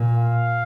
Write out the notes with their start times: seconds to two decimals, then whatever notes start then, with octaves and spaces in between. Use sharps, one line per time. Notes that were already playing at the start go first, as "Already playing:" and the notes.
Already playing: A#2
0.17 F5